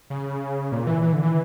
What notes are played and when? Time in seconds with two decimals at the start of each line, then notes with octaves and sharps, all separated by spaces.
0.10 C#3
0.72 A#2
0.87 E3
1.02 E3
1.13 D3
1.23 E3